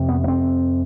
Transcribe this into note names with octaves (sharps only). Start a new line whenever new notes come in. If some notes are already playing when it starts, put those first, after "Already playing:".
Already playing: F2 C3
B3
B3
C4